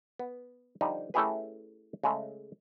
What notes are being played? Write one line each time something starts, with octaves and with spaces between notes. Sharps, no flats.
B3
D3 F3 G3 D#4
A3 C#4 E4 G4 G#4 B4
C#3 G#3 A3